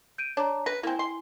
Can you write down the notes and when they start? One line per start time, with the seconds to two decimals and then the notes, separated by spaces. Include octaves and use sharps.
0.18 G6 D7 D#7
0.37 D4 C#5 A#5
0.66 B4 A#6
0.83 A#3 C4 E4 G#5
0.99 C6